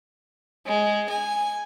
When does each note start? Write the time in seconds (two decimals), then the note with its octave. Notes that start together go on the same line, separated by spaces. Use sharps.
0.66 G#3
1.09 G#5